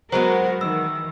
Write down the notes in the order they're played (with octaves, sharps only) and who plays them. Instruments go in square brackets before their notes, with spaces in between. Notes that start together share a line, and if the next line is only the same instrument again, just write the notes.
[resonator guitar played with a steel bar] F#3 G#3 B3 [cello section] F#4 A#4 [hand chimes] C5
[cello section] D#3 E3 [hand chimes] E6